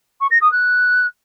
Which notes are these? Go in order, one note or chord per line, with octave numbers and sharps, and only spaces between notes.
C#6
A#6
D#6
F#6